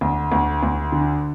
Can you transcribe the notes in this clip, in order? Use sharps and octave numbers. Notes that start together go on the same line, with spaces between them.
D2
D2
D2
D3